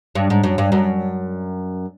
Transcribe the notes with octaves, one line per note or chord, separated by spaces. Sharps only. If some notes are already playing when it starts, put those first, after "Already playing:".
G2
G#2
F#2
G2
F#2